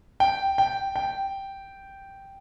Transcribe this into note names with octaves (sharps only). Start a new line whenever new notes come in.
G5
G5
G5